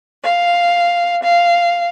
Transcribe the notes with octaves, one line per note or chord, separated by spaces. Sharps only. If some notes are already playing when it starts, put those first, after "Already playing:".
F5
F5